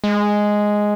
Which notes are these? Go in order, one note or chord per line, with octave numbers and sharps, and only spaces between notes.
G#3